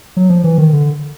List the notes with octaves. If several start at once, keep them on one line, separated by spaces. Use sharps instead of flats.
F#3
F3
E3
D#3
D3